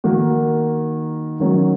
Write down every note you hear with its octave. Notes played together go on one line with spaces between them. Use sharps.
D#3 A#3 D#4 F#4
D#3 F#3 C#4